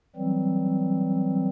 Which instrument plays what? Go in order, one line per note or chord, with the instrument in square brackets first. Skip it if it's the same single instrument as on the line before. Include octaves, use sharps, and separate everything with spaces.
[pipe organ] E3 F#3 G3 C4